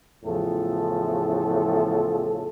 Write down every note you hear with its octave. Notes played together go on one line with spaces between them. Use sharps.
E2 A2 C#3 F3 A4